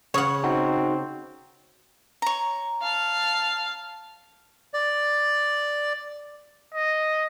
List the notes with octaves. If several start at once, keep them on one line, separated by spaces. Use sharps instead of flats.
C#3 C#5 F#5
C4 D#4 F#4
C#5 A#5
F5 A5
D5
D#5